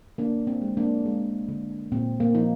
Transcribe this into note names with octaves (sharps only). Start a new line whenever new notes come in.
D3 A#3 D4
C4
G#3
A#3 D4
G#3
D3
A#2 C4
A#3
F3 D#4